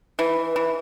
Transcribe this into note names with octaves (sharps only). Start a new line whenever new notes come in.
E3 B4
E3